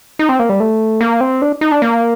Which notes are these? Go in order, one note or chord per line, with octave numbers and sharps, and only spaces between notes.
D#4
C4
A#3
G3
A3
A#3
C4
D4
D#4
D4
A#3